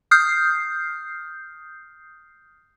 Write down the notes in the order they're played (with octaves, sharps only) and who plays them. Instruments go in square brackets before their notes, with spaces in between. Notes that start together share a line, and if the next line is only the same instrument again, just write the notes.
[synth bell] D#6 F6 G6 C7